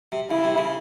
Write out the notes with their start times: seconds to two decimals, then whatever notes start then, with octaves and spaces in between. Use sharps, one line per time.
0.12 C3
0.30 C#3 E4
0.44 C3
0.58 C#3